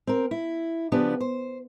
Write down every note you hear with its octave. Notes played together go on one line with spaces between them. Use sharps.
C4 A#4
E4
C#3 F3 B3 D4 G4
C5